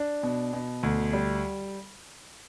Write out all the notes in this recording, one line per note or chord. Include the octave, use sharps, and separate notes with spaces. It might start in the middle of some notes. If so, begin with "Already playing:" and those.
Already playing: D4
B2
B2
D2
G3